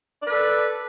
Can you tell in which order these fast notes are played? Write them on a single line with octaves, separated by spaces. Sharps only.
D5 B4 A4